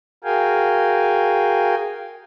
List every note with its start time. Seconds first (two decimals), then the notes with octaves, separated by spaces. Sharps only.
0.24 F#4 G#4 A#4 F5 G5 G#5